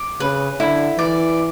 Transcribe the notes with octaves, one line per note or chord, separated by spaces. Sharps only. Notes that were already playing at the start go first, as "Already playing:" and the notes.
Already playing: D6
C#3 B4
D3 E4
E3 D5